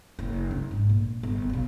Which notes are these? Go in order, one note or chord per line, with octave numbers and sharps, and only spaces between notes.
F#1
D4
G#2
A#1
G1
B1 C#3